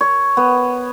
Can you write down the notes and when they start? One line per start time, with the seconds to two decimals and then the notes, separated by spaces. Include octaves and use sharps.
0.01 C#5
0.37 B3